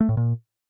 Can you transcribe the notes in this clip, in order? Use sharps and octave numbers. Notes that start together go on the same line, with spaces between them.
A3
A2
A#2